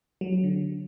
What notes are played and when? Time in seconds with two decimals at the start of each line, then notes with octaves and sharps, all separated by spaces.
0.21 F#3
0.32 F#3
0.44 D3